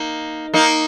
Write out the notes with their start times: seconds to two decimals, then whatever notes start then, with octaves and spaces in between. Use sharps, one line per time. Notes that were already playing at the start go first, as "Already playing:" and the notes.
Already playing: A#3 D#4
0.54 A#3 D#4